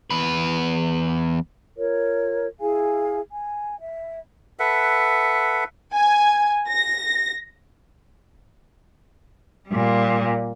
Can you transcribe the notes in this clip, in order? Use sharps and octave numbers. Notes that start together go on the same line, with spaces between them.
E2 B4
F4 A#4 C#5
E4 G#4 F5 G#5
G#5
E5
A4 B4 E5 F#5
G#5
A#6
A#2 G3